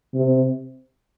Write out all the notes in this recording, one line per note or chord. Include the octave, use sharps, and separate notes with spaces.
C3